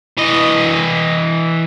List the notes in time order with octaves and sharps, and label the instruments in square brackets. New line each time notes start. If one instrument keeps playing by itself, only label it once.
[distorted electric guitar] E3 D#5